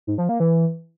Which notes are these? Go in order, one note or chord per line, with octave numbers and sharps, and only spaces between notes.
G#2
F3
A#3
E3